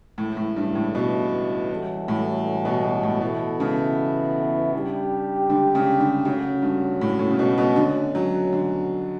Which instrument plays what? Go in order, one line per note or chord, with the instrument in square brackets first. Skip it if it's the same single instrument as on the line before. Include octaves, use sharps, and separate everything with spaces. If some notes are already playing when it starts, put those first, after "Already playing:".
[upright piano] A2 [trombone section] C#3 E3 A3 E4
[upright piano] A2
G2
A2
B2
[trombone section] E3 G3 C#4 F#4 A4
[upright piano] A2
B2
B2
A2
[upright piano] B2 [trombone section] E3 B3 E4 A4
[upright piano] C#3
[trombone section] G3 D4 G4
[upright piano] D3
C#3
D3
[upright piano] C#3 [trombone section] F#3 A3 C#4 F#4
[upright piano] G2
A2
A2
C#3
B2
B2
[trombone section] B2 A3 C#4 [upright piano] D3
[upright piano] F#3
D3